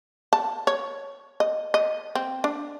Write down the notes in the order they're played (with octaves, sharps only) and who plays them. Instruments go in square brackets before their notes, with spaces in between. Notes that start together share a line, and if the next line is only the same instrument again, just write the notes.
[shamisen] A5
C#5
D#5
D#5
C4
D4